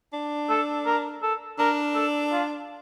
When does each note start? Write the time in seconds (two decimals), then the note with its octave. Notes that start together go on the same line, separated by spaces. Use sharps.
0.13 D4
0.49 A4
0.86 A#4
1.23 A4
1.59 D4 A#4
1.95 A4
2.32 F4